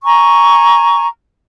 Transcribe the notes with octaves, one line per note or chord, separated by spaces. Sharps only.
G#5 A#5 C#6